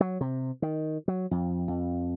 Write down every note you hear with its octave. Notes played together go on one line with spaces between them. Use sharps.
F#3
C3
D#3
F#3
F2
F2